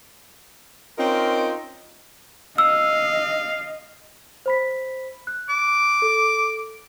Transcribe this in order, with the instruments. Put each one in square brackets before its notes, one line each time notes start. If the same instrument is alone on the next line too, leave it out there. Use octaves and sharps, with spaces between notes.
[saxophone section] C4 C#4 D#4 F4 A#4
[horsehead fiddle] D#5 [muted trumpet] F5 [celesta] E6
[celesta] C5 B5 B6
F#6
[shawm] D6
[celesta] A4